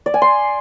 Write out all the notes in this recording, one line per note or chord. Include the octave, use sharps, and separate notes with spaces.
D5
G#5
C6